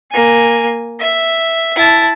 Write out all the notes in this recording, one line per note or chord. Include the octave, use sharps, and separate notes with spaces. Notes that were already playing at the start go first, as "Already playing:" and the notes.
A#3 G#5
E5
E4 A5